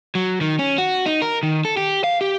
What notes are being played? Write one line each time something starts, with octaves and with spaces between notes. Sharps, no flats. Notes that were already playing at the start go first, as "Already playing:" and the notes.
F#3
D#3
C#4
F#4
D#4
A#4
D#3
A4
G4
F5
G4